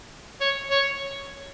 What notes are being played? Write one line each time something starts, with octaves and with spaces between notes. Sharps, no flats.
C#5
C#5